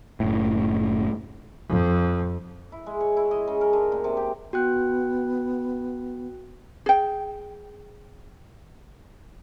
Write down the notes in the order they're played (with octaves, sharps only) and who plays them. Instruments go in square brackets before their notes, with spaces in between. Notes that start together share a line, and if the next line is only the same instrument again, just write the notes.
[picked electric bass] F#1 A2
[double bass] F2
[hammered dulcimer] E4
G#3
C#5
E4
D#5
C#3
A#4
D3
A#2
C3
G4
[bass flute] B3 [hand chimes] F#4 G5 F#6
[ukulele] G#4 G5